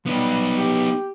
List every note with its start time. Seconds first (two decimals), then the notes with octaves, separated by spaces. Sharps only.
0.06 G3 B3 D#4
0.57 G4